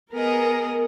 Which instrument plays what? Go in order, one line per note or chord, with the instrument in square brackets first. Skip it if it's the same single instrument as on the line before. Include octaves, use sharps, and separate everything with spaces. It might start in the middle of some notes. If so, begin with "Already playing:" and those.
[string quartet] B3 G#4 D#5 [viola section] A#4